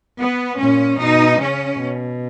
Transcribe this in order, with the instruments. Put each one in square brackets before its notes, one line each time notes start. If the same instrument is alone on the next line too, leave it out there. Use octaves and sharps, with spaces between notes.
[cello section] B3
[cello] A#2 [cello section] C#4
[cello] B2 [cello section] D#4
[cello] C#3 [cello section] C#4
[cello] B2